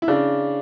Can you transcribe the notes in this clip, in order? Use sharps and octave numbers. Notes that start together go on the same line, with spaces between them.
E4
C#3 D4